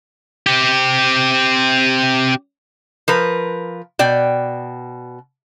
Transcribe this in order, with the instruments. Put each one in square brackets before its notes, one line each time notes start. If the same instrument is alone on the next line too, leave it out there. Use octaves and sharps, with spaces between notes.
[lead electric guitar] C4 G4
[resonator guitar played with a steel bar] F3 A#4 B4
B2 D5 G5